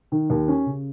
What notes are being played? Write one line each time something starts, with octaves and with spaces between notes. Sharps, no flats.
D#3
D#2
C#4
C#3